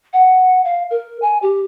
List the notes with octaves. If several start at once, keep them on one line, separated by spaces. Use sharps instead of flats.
F#5
F5
A#4
G#5
G4